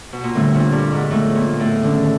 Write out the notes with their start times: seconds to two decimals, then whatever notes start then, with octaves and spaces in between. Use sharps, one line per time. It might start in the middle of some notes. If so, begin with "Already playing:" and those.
0.12 B2
0.24 A#2
0.35 A2 D3 G3 C4
0.55 A#2
0.72 G2
0.92 G#2
1.11 A2 F3 G#3 B3
1.35 A#2
1.60 A2
1.84 D3 D#3 G#3 C#4